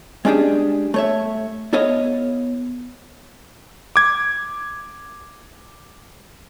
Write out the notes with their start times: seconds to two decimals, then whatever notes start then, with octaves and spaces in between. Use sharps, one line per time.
0.25 G#3 C#4 D4 G4 G#4
0.94 A3 C#5 E5
1.73 B3 E4 A4 C#5 D#5 F5
3.96 D6 G#6